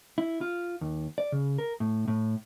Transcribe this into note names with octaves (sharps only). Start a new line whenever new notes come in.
E4
F4
D#2
D5
C#3
A#4
A2
A2